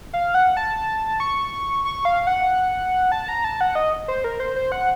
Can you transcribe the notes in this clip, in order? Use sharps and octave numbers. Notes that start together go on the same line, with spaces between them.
F5
F#5
A5
C#6
C#6
F5
F#5
A5
A#5
A5
F#5
D#5
C5
A#4
C5
C5
F#5